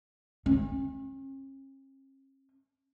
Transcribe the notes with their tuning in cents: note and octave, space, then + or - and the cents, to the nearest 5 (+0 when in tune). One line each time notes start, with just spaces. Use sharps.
C#4 -45